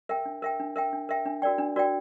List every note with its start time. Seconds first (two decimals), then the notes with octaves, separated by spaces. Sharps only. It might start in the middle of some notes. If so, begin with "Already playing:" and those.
0.09 A#4 E5 G5
0.26 D4
0.42 A#4 E5 G5
0.60 D4
0.76 A#4 E5 G5
0.93 D4
1.09 A#4 E5 G5
1.25 D4
1.42 F#4 A#4 D5 G5
1.58 D4
1.76 F#4 A#4 D5 G5